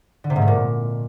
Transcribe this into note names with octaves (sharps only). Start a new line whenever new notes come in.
D3
C3
G#2
A3
A#2